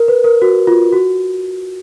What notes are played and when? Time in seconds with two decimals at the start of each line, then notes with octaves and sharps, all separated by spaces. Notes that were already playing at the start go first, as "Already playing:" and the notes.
Already playing: A#4
0.08 B4
0.24 A#4
0.42 F#4
0.67 F4
0.93 F#4